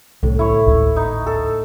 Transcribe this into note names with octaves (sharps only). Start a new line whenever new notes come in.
C2 A2 D3
E4 C#5
G#1 D2
D#4
A4